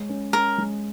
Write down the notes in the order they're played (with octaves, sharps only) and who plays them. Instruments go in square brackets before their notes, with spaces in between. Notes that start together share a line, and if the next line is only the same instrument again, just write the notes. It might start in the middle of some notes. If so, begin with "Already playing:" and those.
Already playing: [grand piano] G#3 C#5
C#4
[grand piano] C#4 [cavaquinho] A#4
[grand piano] G#3